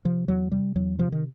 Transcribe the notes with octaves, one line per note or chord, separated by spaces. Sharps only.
C3 F3
E2 F#3
C3 G3
E2 F#3
C3 F3
D#3